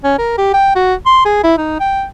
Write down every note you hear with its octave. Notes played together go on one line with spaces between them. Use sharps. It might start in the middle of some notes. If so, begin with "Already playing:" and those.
C#4
A#4
G4
G5
F#4
C6
G#4
E4
D#4
G5